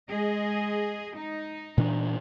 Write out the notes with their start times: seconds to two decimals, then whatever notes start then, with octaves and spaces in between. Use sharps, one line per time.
0.11 G#3 G#4 D#5
1.17 D#4
1.78 A#2 E3 D4